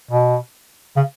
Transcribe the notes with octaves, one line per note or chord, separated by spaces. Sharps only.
B2
C#3